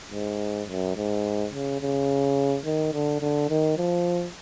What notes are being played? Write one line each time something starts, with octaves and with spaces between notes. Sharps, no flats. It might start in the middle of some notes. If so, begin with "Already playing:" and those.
G#2
F#2
G#2
C#3
C#3
D#3
D3
D3
D#3
F3